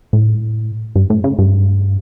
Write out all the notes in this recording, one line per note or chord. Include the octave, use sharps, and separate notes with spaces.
A2
G2
A2
C#3
G2